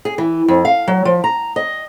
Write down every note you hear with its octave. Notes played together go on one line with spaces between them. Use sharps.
G#4
E3
F2
F5
F#3
F3
A#5
D#5